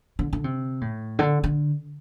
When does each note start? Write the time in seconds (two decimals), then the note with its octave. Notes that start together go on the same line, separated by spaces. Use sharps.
0.19 D3
0.33 D3
0.44 C3
0.81 A2
1.19 D3
1.44 D3